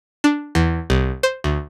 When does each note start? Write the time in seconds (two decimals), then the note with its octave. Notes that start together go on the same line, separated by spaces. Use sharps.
0.24 D4
0.55 E2
0.90 C2
1.23 C5
1.44 D2